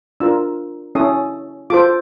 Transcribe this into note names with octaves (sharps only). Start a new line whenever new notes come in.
D4 F4 A#4 E6
C#4 E4 A4 C#5 D#6
F4 A4 C5 D6